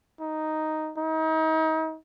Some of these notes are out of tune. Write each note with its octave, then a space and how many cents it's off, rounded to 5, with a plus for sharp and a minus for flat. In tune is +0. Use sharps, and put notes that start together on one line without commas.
D#4 +0
D#4 +35